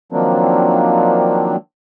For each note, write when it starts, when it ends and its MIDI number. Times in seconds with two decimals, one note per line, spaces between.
0.12 1.56 51
0.12 1.56 53
0.12 1.56 54
0.12 1.56 58
0.12 1.56 60
0.12 1.56 62